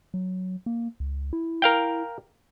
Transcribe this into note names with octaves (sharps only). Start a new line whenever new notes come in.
F#3
A#3
C#2
E4
A#4 F5 G5